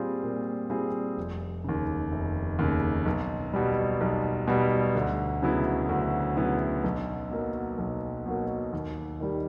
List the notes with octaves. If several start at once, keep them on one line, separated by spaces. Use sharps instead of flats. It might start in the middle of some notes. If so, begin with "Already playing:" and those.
Already playing: A#2 G3 C4 F4 G#4
A#2
G3 C4 F4 G#4
F1
D#2 C#3
F1
D#2 C#3
B1
B2 G3
B1
B2 G3
D2
C#3 F#3 B3 E4
D2
C#3 F#3 B3 E4
B1
B2 F#3 A#3
B1
B2 F#3 A#3
D#2
D#3 G3